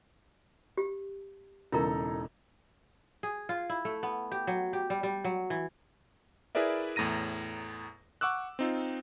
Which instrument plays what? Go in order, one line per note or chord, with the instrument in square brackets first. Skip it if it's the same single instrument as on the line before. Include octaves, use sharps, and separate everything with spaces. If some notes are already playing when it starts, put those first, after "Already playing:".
[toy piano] G4
[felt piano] E1 C#3 E3 [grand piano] D#4 A4 A#5 [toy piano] E4 A#4
[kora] G#4
F4
E4
A3
B3
G4
F#3
G4
G3
G3
F#3
E3
[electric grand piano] E4 G#4 A#4 B4 D5 E5
E2 A2 A#5 A#6 D#7
F#5 C#6 D6 E6 F#6
C4 D#4 F4